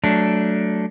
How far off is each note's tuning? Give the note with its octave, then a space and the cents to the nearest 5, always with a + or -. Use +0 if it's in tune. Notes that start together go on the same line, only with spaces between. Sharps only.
F#3 +20 A3 +0 D4 +0